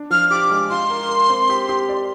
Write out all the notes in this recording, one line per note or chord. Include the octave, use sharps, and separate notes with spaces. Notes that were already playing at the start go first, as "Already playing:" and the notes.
Already playing: D4
F3 F6
G4 D6
G#3
F4 C6
A#4
A#4
C4
G4
G4
D5